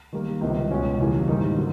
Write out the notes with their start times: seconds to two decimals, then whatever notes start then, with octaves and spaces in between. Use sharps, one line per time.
0.13 D#3 G3 A#3
0.41 C#2 C3 D#3 G3
0.70 C#2 B2 G#3 C#4 F#4
0.99 E2 C#3 E3 G3 A#3
1.28 G#2 D#3 G3 A#3 D#4
1.57 D3 F#3